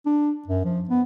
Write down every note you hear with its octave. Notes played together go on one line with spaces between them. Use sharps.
D4
F#2
F3
B3